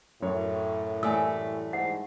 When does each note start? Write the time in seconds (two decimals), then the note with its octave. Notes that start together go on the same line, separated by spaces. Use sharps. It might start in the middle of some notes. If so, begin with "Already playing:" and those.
0.22 F#2 A2 C#5
1.03 E3 G3 A3 G#5 E6
1.73 G#2 F#5